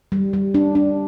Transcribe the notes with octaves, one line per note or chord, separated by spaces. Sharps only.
G3
G3
D4
D4